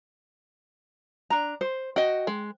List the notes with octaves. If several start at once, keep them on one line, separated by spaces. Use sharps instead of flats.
D4 A#5
C5
F#4 D#5 G5
G#3